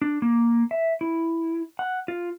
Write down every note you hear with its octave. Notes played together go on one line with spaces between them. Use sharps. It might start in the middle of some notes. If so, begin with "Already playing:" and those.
D4
A#3
E5
E4
F#5
F4